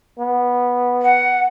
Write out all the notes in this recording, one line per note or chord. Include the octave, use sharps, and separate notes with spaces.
B3
F#5